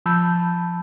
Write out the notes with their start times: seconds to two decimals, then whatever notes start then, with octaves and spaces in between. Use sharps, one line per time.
0.06 F3 A5 B5 E6 G6